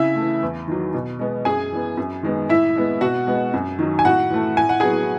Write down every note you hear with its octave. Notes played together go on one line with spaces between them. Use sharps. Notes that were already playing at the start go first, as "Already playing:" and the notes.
Already playing: C#3 E4 E5
A3
E3
E2
D#3 F#3
B2
G#3 B3
F#2 G#4 G#5
E3 B3
F#2
D#3 G#3 B3
A2 E4 E5
G#3 B3
B2 F#4 F#5
G#3 B3
F#2
D#3 F#3
G#5
A2 F#4 F#5
E3 A3
A2 G#5
F#5
F#3 B3 G#4 G#5